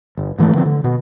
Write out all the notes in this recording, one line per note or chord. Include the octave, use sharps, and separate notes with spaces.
G1
G#2 E3 G#3 A3
D3 F3 C4
D3
B2